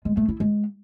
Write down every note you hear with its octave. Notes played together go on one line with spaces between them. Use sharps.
G#3
A3
E4
G#3